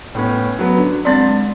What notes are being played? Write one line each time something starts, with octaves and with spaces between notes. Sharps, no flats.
A2 B3 C#4
F#3 B3
D3
G#3 C4 D5 C6 A6